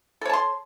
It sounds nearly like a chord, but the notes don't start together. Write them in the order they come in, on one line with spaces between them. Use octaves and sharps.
A4 C#5 A5 C6